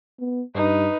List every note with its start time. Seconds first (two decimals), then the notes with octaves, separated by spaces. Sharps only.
0.20 B3
0.55 G2 D#4 B4